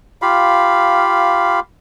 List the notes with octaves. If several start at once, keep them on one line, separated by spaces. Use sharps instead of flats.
F4 G4 F5 B5